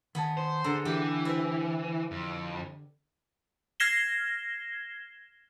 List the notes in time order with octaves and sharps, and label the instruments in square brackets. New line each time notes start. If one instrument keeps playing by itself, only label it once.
[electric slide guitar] D#3 A5 [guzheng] B3 G#4
[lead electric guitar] C5
[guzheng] D3 [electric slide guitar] G#4 A4 A#5
[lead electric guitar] E3 [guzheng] G4
[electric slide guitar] E4 B4 C5 [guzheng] E5
[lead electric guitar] F2
[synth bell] F6 G#6 A#6 C7 E7 G7